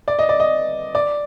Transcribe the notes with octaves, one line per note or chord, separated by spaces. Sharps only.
D5
D#5
D5
D#5
D5